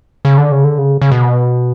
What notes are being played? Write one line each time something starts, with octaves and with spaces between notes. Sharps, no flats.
C#3
D3
C#3
D3
C#3
C#3
B2